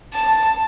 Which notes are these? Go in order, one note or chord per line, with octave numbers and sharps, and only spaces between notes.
A5